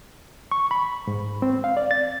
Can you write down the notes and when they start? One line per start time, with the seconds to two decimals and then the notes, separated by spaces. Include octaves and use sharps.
0.52 C#6
0.71 B5
1.07 G#2
1.42 C4
1.64 F5
1.77 D5
1.91 A6